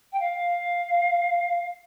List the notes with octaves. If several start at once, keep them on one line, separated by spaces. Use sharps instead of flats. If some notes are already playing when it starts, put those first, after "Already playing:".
G5
F5